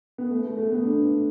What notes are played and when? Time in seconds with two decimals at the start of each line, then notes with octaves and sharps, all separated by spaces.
0.18 B3
0.30 A3
0.44 A3
0.57 A3
0.72 B3
0.85 D4